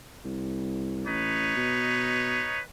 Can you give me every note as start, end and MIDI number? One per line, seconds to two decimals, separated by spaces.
0.24 1.06 36
1.08 1.56 33
1.08 2.61 63
1.08 2.61 71
1.08 2.61 73
1.57 2.50 47